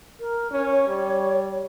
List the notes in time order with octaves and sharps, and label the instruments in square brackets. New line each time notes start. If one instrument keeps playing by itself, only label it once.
[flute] A#4
[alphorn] C#4 [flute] C#5
[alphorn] G3